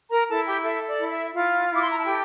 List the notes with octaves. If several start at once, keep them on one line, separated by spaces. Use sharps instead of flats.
A#4 A#5
E4 A4 A5
G4 G5
A4 E5
D5
E4
E5
E4 F4 F5
E4
D6
C6
A#5
A5
G4 A4 G5